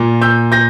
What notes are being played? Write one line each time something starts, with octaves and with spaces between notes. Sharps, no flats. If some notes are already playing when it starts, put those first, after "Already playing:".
Already playing: A#2
E6 G6
G6 A#6